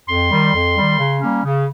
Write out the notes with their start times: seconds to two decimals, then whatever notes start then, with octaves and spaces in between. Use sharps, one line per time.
0.08 F2 C6
0.31 D#3 G3
0.54 F2
0.76 D#3 G3
0.98 C#3
1.21 G3 A#3 C#4
1.44 C#3